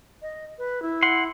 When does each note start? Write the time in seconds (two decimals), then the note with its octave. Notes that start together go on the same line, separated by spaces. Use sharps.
0.22 D#5
0.59 B4
0.82 E4
1.03 F#5 C6